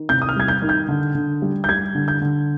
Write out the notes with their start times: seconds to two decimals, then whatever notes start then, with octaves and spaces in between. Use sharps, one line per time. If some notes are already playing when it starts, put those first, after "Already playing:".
Already playing: D#3
0.09 C3 G6
0.22 D#6
0.29 F6
0.36 G3 G#6
0.48 G6
0.62 D#3
0.69 G6
0.88 D3
1.15 D3
1.42 G3
1.64 G6
1.69 G3 G#6
1.95 D3
2.08 G6
2.22 D3